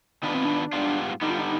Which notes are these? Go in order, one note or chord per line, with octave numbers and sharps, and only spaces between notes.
D#3 B3 D4 F4 B4
C4
D4
G#2 G3 B3 F4
D3 G3 B3 D#4
F4
D#4